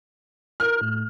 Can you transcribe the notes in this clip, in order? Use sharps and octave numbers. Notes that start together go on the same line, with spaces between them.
A#4 F6
A2